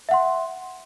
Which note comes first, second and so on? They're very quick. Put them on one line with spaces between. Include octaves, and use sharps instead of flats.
E5 F#5 C6